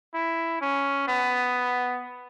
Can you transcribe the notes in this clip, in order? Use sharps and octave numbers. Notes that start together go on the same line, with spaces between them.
E4
C#4
B3